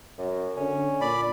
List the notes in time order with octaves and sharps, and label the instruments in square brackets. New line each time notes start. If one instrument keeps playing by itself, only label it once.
[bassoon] F#2
[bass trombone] D3 [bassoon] C#4
[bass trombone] A#2 [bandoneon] D5 B5